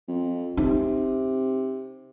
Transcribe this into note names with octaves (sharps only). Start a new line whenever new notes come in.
F2
C3 D#4